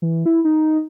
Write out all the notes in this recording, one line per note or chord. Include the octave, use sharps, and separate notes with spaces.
E3
E4
D#4